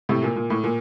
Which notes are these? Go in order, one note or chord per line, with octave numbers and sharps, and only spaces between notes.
A2 C3
A#2
A#2
A2
A#2